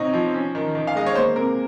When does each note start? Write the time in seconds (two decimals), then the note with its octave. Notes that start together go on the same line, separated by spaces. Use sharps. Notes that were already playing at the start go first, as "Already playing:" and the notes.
Already playing: C3 C4 D#4 C#5
0.13 F3
0.34 C#4
0.55 D#3
0.75 D#3
0.87 F5
0.95 G#3 D#5
1.06 C#5
1.15 A#3 C5
1.36 C3 A#4